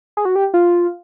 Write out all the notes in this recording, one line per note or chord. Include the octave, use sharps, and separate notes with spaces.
G#4
F#4
G4
F4